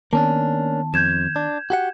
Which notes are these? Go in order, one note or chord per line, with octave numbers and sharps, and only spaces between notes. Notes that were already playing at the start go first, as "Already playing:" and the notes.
D#3 A#3 B3 C#4 D4 A5
F2 G6 G#6 E7
D4
F#4 G4 F#5